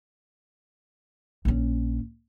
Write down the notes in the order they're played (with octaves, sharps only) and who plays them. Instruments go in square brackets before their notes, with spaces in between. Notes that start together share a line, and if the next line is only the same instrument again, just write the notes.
[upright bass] A#1 C#4